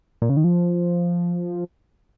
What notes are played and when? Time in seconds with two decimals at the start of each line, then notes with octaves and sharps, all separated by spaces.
0.22 A#2
0.29 C#3
0.37 D#3
0.44 F3